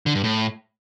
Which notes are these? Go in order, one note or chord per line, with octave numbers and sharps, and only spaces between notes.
D3
G2
A2